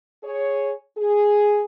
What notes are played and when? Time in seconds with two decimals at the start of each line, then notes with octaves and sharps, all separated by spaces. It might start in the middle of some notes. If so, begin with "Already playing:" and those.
0.23 G#4 C#5
0.98 G#4